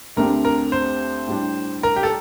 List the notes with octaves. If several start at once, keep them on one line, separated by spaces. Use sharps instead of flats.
D2 D3 A3 C4 G4 A#4
A#4
C5
A2 G3 D4
A#4
G4
A4